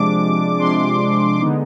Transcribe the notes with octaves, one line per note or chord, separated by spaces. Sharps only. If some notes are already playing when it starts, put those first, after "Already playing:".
Already playing: C3 F3 G#3 D4 D6
C3 F3 G#3 D4 C6
D3 G#3 B3 D#4